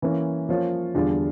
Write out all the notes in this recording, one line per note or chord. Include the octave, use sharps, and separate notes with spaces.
E3 A#3 C#4
F3 A#3 C#4 F4 C#5
E2 D3 G3 D4 F4